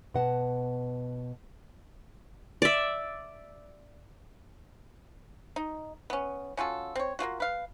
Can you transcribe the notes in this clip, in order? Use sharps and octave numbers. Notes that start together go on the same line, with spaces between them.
B2 F#5 A5
D5 E5
D#4
B3 C#4
C#4 F4 F#4 A4
C4 C#5
A#3 C4 F4 F#4
B4 F5